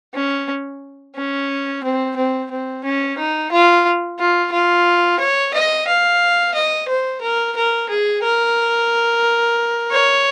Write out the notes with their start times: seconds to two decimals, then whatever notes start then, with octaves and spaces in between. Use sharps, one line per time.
0.14 C#4
1.16 C#4
1.83 C4
2.17 C4
2.51 C4
2.84 C#4
3.18 D#4
3.52 F4
4.19 F4
4.52 F4
5.20 C#5
5.54 D#5
5.87 F5
6.54 D#5
6.88 C5
7.21 A#4
7.56 A#4
7.89 G#4
8.23 A#4
9.91 C#5